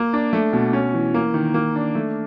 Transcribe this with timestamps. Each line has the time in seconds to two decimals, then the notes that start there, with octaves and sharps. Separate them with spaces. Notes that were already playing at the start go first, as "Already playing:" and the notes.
Already playing: A#3
0.13 D4
0.33 A3
0.53 B2
0.73 C#4
0.94 E3
1.14 A#3
1.34 D#3
1.54 A#3
1.76 D4
1.95 A3